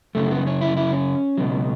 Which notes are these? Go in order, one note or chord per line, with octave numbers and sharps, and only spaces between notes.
F#2 C#3 F#3 A3
B3
C#4
E4
E4
C#4
C#2 B2 F#3